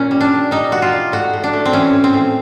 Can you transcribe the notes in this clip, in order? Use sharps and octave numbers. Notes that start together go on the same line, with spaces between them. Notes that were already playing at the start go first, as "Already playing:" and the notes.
Already playing: A#2 C#4
G3
D4
A#2
G3 D#4
A#2 F#4
F4
G3
A2 F#4
A2
D4
A3
C4
E3 C#4
A2
C4
A2